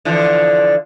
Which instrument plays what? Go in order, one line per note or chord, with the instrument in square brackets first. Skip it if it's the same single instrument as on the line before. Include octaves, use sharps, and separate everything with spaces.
[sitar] D3 E3 F3